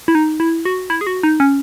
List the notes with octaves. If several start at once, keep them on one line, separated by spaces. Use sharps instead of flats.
E4
D#4
E4
F#4
E4
G#4
F#4
D#4
C#4